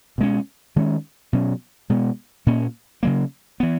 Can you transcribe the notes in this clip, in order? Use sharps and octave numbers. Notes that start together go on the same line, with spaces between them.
B2 G#3 C#4
D#3 G#3 C#4
B2 F#3 C#4
B2 G#3 B3
A#2 A#3 C#4
C#3 F#3 A#3
E3 B3